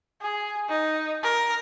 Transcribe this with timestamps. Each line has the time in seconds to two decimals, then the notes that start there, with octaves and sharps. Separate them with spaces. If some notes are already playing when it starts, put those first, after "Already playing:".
0.21 G#4
0.69 D#4
1.23 A#4